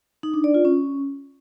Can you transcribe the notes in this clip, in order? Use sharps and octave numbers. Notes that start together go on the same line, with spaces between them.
D#4
D4
D5
F4
C#4